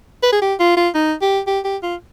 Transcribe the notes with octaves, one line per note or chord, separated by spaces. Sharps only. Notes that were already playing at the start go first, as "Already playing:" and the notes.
B4
G#4
G4
F4
F4
D#4
G4
G4
G4
F4